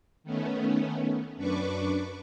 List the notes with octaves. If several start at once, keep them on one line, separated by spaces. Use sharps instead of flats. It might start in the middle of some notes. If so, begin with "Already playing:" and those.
D#3 A3 B3 C#4
F#2 D4 B4 C#6 D6